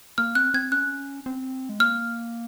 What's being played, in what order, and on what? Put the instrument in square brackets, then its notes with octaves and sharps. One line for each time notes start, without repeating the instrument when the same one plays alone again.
[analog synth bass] A#3 [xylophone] F6
[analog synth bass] C4 [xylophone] F#6
[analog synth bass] C4 [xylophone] G#6
[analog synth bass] C#4 [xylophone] F#6
[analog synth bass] C4
G#3
[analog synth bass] A#3 [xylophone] F6